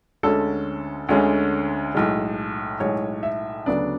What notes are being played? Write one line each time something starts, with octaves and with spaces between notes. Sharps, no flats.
D2 D3 G#3 C#4 A4
D2 D3 G#3 C#4
B1 A2 G#3
B1 A2 G#3 C#5
E5
D2 C#3 F#3 B3 D4 D5